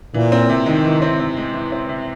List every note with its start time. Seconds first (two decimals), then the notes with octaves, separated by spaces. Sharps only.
0.14 A#2 E3
0.32 C4
0.49 C3
0.66 D#3 G#3
0.85 E3
1.02 C4
1.20 C3
1.37 G#3
1.54 E3
1.72 C4
1.89 C3